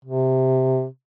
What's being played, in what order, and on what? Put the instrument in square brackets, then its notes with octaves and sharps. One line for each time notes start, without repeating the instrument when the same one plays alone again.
[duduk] C3